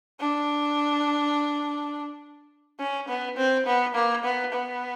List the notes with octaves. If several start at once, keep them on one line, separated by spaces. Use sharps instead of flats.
D4
C#4
B3
C4
B3
A#3
B3
B3